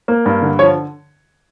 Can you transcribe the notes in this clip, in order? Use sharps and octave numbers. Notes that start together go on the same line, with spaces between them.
A#3
G2
D3
F3 C#5